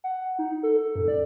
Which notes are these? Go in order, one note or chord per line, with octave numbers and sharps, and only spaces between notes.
F#5
D#4
A4
F#2
D5